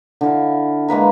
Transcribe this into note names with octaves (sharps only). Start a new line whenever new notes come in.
D3 E4 F5
G#3 A#3 B4 A#5